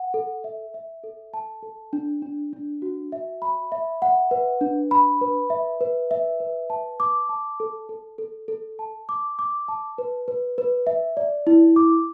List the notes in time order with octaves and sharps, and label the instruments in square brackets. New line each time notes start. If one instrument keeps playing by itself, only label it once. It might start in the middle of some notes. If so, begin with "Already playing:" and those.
Already playing: [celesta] F#5
A4
E5
E5
A4
A5
A4
D4
D4
D4
F#4
E5
B5
E5
F#5
B4
D4
B5
B4
E5
B4
E5
B4
A5
D6
A5
A4
A4
A4
A4
A5
D6
D6
A5
B4
B4
B4
E5
D5
E4
D6